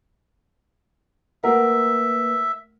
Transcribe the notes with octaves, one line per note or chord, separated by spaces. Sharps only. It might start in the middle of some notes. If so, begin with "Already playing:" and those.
A3 A#3 A#4 B4 E5 F#5